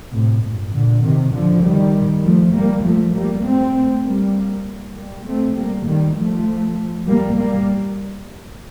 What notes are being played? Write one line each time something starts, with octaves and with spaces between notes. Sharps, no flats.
A2 C3
G2 A#2
A#2 D3
C3 D#3
D3 F3
D#3 G3
F3 A3
G3 A#3
F3 A3
G3 A#3
A3 C4
G3 A#3
G3 A#3
A3 C4
G3 A#3
D#3 G3
F3 A3
G3 A#3
G3 A#3